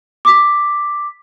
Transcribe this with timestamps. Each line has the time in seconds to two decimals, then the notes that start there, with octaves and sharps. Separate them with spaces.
0.25 D6 B6